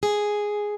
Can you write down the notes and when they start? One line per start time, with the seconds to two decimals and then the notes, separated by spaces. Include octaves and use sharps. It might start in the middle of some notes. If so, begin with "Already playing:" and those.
0.03 G#4